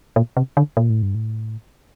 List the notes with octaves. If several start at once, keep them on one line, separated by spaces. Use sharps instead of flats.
A#2
C3
D3
A#2
A2
G2
A2